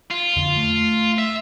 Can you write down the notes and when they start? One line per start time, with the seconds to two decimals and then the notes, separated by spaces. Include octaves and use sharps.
0.11 F4
0.37 F2 D3
0.57 A3
1.18 E5